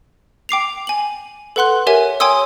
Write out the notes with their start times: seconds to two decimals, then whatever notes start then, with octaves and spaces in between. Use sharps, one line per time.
0.49 G5 D6 C7 F7
0.87 G#5 F#7
1.56 A4 B4 F#5 C6 F#6
1.87 G4 A#4 C#5 E5 G#5 D#7
2.20 C#5 G5 G#5 C6 D#6 E6